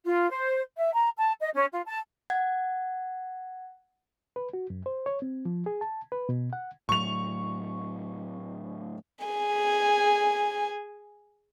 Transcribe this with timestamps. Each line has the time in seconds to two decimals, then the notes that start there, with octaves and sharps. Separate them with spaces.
0.05 F4
0.30 C5
0.78 E5
0.94 A#5
1.17 A5
1.40 D#5
1.54 C#4
1.71 F4
1.86 A5
2.30 F#5 G#6
4.36 B4
4.53 F#4
4.70 F#2
4.86 C5
5.06 C#5
5.22 C4
5.45 F3
5.66 G#4
5.81 A5
6.12 B4
6.29 B2
6.53 F#5
6.89 A2 F#3 A3 C#6 F7
9.25 G#4 G#5